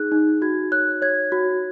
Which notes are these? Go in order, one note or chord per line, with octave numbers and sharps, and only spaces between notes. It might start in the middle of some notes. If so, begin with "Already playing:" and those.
Already playing: D#4 G#4 F#6
D#4
F#4 G#6
C#5 F#6
C#5 G#6
F#4